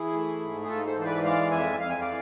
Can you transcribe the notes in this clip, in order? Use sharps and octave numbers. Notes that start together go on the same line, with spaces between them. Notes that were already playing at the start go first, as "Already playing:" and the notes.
Already playing: E3 E4 G#4
A3
G#2
G#4
G#2 F4 A4
A4 C5
E3 C5
B4 D5
G#3 D5 F5
F2 E5 G#5
F2 F5
G#5
D5 F5
E3